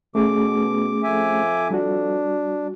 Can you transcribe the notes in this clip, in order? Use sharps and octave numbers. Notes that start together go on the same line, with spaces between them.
B2 A3 C#4 G#4 D6
F2 F3 A4 E5 G#5 D6
G3 D4 F#4